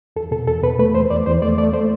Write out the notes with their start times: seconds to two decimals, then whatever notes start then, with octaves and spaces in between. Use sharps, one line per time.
0.16 E2 A4
0.31 B2 A4
0.47 E2 A4
0.63 B2 B4
0.79 A3 B4
0.95 E2 C5
1.10 E2 D5
1.26 E2 C5
1.42 A3 D5
1.58 A3 D5
1.73 A3 C5